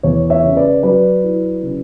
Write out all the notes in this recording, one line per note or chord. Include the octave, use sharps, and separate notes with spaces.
E2 C#5
C#5 E5
C#3
B4 D5
F#3 B4 D5
E4
C#3